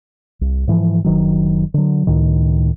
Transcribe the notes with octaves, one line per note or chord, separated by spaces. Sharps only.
C2
G#2 E3 F3
F#1 D#3 F#3
D3 F#3
C#2 A2 D#3